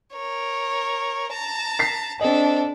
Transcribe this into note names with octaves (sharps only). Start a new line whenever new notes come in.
A#4 C#5
A5 A#5
B6 C7
C4 D4 A4 D#5